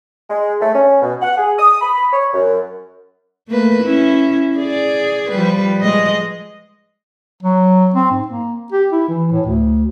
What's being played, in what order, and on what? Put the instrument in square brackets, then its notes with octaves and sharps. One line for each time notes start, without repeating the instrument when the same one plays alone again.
[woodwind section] G#3
A3
C#4
B2
F#5
G#4
D#6
B5
C#5
F#2
[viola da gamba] A3 A#3 B4
C#4 E4
G#4 D5
F3 G3 B4
G#3 D#5
[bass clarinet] F#3
C4
G#2
A#3
G4
E4
E3
A2
D2